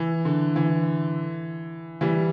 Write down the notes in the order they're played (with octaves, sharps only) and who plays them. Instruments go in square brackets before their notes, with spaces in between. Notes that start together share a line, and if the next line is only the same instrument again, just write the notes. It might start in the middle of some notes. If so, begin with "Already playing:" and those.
Already playing: [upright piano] E3
D3
E3
E3 G3